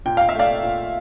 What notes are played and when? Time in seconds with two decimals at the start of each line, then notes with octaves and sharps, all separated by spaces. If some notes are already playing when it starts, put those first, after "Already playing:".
0.06 A#2 G5
0.17 F5
0.29 E5
0.35 A3 D5 F5
0.63 A#2